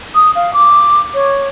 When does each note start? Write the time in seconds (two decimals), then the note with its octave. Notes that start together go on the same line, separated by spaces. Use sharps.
0.15 D#6
0.36 F5
0.54 D6
1.14 C#5